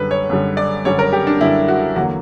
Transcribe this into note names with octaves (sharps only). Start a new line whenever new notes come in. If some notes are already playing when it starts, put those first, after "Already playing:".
Already playing: F#2 D3 G3 B4
C#5
F#2 D3 G3
D5
F#2 D3 G3 C#5
A#4
G4
D4
F#2 D3 G3 E4
F#4
E2 D3 F#3 A#3 F#4